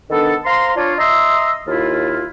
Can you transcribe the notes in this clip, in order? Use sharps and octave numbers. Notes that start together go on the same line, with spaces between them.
D#3 B3 D4 A4
C5 F5 A#5 C6
D4 F4 C#5
D#5 E5 A#5 C6 D#6 E6
D#2 E4 F4